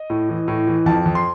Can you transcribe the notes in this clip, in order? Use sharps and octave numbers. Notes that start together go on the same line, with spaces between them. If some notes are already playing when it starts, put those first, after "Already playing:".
Already playing: D#5
A2
E3
A2
E3
F2 A5
F2
C6